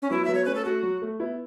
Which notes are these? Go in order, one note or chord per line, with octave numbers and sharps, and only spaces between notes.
C#4
F#3 B3 E4
F#3 B3 E5
C#5
A3 C#4 B4
A4
A3 F#4
F#3
A3
B3 E4